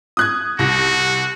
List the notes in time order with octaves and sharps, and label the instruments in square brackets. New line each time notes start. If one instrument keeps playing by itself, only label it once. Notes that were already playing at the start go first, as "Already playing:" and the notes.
[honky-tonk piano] D#6 F#6 G#6
[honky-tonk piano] C2 A#6 [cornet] F#4